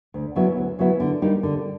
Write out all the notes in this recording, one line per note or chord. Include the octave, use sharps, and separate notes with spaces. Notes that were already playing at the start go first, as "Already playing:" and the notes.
D2
C#3 F#3 B3 E4
D2
C#3 F#3 B3 E4
D3
G3 A#3 D#4 G4
D3